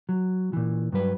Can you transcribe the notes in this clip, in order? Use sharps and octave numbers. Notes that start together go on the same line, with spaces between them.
F#3
A#2 E3
G2 F#3 B4